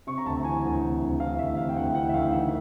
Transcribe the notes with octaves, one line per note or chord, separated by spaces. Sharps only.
C3 C#6
A#5
D2 A5
E3 G#5
D2
C3
D2
E3 F5
D2 E5
C3 F5
G5
D2 F#5
E3 F#5
E5
D2 F5
D#3 E5